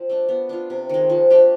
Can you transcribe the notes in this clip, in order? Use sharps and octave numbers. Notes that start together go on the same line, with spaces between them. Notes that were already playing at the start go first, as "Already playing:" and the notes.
Already playing: F3 C4
A3 D4
B3
D4 F4
C3
D#3 G#3
F3
A3 D4 G4